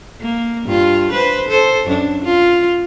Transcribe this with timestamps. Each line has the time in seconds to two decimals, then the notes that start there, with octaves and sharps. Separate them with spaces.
0.20 A#3
0.64 G2 F4
1.12 B4 C5
1.48 A4 C5
1.87 F#2 D4
2.24 F4